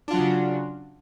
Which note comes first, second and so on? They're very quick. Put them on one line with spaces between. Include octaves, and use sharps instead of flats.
D4 F4 F#3 F#4 C#3